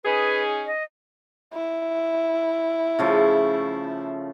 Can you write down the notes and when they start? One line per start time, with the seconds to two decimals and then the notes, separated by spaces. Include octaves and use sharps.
0.04 C#4 D#4 G#4 B4
0.66 D#5
1.53 E4
2.99 C#3 F3 A3